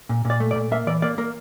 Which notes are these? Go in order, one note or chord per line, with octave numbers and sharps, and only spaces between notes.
A#2
A#2
D5
A3
D5
A#2
A#3 E5
E3 D5
A#3 D5
A#3 A#4